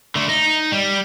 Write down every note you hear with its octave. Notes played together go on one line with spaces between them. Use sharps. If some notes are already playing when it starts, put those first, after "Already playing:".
D3 A3
D#4
G3